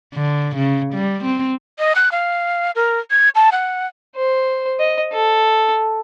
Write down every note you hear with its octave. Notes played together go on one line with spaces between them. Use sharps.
D3
C#3
G3
C4
D#5
F#6
F5
A#4
G#6
A5
F#5
C5
D#5
A4